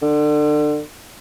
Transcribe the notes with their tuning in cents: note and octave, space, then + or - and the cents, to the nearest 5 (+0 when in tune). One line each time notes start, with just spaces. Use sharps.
D3 +30